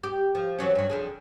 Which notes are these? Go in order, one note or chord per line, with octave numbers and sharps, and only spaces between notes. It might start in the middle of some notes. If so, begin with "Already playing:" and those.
G4
F3
E3 F#3 C#4
G2 F#3
F2 D3 G#4